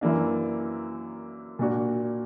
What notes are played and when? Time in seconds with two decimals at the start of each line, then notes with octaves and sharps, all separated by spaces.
0.01 F#2 E3 A#3 D4
1.59 A#2 A#3 D4 F#4